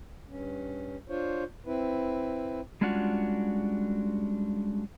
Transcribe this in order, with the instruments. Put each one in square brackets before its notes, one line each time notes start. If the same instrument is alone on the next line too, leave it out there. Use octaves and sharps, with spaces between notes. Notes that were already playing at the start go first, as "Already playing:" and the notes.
[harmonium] G2 C#4
D4 F4 C5 C#5
C4 E4 B4
[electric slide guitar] G3 G#3 C#4 D4 F4 F#4